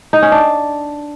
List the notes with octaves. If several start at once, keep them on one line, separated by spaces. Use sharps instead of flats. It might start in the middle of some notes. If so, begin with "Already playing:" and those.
D#4
C#4
D4